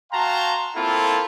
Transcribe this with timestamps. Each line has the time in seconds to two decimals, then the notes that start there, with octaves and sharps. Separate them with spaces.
0.12 F#4 F5 G5 A5 A#5 C6
0.76 A#3 C4 E4 F4 A4